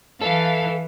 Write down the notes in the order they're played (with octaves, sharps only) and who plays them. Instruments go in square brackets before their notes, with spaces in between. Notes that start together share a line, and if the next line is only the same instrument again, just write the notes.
[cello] E3 [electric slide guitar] A4 [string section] F5